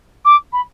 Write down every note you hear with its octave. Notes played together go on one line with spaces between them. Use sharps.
D6
B5